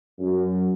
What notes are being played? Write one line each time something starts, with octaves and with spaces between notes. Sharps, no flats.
F#2